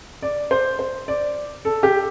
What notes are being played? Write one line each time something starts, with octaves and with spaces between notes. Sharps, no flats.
D5
C5
C5
D5
A4
G4